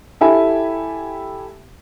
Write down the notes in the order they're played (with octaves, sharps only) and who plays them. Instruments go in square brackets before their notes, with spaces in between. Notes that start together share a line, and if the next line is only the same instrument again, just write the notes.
[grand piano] E4 G4 A4 E5 G#5 B5